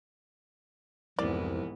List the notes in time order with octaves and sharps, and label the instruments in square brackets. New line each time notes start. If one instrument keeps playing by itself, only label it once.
[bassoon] C2 [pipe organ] F2 [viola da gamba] G#2 E3 B3 [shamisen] D5